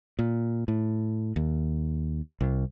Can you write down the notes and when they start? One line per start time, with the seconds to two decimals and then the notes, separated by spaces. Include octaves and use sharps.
0.19 A#2
0.68 A2
1.36 D#2
2.41 C2